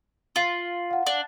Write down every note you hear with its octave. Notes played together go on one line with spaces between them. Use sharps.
F4 C7 F#7
F5 F#5
D4